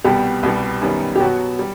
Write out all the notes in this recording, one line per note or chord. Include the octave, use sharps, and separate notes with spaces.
C2 B2 G3 B3 G4
C2 B2 G3 B3
F#2 D#3 G3 B3
G4
B2 F#3 B3 F#4
G3